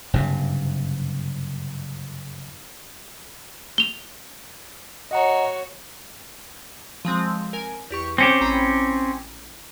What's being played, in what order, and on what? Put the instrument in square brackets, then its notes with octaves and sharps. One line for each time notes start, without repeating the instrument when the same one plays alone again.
[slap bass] F#1 G2 C3
[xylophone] F7 G7
[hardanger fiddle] F#4 C#5 [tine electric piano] D#5 F#5 A#5
[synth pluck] F3 G#3 C4
A#4 G#5
E2 G4 C#6
[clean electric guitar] C4 C#4 G4 [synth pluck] C5
[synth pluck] A1 A#5 B5